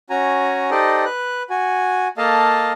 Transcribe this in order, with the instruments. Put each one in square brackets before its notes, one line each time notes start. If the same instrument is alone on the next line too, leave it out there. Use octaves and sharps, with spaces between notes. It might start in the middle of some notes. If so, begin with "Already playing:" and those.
[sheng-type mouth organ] C#4 F#4 G#5 A#5
D#4 G4 A4 C5 D5 D#5
B4 F#6
F#4 G#5
A#3 A4 D#5 F5 A5